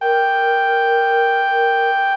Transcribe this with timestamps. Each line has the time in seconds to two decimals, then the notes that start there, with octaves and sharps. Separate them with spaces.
0.01 A#4 G5